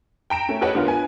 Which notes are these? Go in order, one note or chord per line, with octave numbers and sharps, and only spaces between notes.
G5 A#5 D7 E7
A3 C#4
G4 A4 B4 C#5 D#5 F#5
D3 B3 F4 A#4
B4 G#5